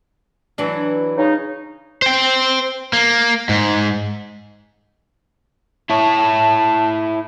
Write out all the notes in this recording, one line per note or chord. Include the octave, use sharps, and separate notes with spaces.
E3 F#3 D4
C#3 D#4
C5 G5
A#3
G#2
E4 C#5 A5